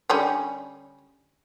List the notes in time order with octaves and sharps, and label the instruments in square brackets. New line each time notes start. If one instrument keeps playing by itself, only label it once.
[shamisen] D3 G3 C#4